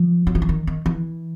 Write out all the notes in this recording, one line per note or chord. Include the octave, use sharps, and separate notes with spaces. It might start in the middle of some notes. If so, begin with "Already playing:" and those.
Already playing: F3
F#3
F3
E3
D#3
D#3
E3